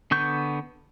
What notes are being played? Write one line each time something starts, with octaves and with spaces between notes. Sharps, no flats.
D3 B3 C#6 G6